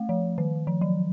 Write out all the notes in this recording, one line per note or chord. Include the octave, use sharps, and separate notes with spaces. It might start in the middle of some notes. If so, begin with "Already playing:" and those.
Already playing: A3
F3
D#3
F3
F#3